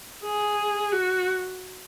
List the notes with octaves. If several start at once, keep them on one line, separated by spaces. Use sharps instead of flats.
G#4
F#4